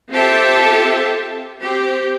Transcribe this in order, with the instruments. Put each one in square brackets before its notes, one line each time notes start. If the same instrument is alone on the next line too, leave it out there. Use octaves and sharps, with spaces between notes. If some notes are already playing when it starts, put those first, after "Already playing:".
[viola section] C4 F4 G4 A4 E5 A5
C4 G4